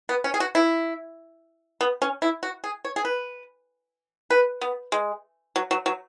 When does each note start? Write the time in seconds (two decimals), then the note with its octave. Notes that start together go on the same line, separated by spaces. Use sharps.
0.09 B3
0.24 C#4
0.34 G#4
0.40 F#4
0.55 E4
1.81 B3
2.02 C#4
2.22 E4
2.43 F#4
2.64 G#4
2.85 C#5
2.96 G#4
3.05 B4
4.30 B4
4.61 B3
4.92 G#3
5.56 F#3
5.71 F#3
5.86 F#3